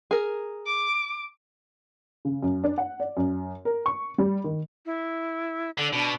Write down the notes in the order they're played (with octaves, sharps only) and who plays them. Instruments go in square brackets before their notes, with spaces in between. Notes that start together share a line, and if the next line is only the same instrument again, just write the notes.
[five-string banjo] G#4 A#4
[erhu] D6
[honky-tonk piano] C#3
F#2
D4
F#5
D5
F#2
A#4
C#6
G3
D#3
[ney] E4
[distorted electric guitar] D3 [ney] A4
[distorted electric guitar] B2 [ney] D4